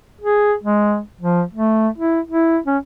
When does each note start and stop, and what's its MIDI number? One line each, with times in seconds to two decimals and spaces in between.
0.21 0.54 68
0.63 0.99 56
1.21 1.42 53
1.53 1.88 57
1.98 2.20 64
2.27 2.57 64
2.67 2.78 61